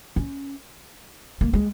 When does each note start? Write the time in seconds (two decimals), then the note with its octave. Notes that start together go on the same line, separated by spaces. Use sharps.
0.16 C#4
1.41 A#3
1.53 G#3